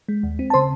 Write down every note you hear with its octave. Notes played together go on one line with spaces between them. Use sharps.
G#3
D#2
C4
A5
C#3 C5 C6